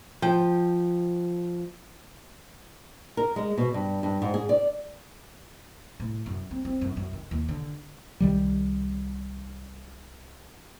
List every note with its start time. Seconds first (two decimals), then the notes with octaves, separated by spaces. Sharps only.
0.22 F3 G5
3.17 A#4
3.36 G#3
3.58 B2
3.74 G2
4.03 G2
4.22 G#2
4.34 G#4
4.49 D5
6.00 A2
6.26 F#2
6.51 C4
6.65 C4
6.81 F#2
6.97 F#2
7.13 D#3
7.31 D#2
7.48 D3
8.20 C2 D#3 G3